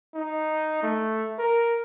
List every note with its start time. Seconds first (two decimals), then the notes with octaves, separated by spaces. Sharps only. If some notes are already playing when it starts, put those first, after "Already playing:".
0.15 D#4
0.83 A3
1.39 A#4